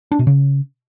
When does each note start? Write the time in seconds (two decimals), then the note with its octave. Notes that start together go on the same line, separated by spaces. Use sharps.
0.11 D4
0.19 B2
0.27 C#3